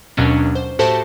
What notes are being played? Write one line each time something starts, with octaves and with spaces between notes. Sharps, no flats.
D#2 B2 F#3 C#4 D4
C5
A2 F#4 G4 A4 C5 A5